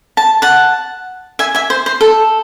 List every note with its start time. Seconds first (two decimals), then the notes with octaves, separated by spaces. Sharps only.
0.17 A5
0.42 F#5 A5
1.39 E5 G#5
1.55 E5 G#5
1.70 C5
1.86 C5
2.01 A4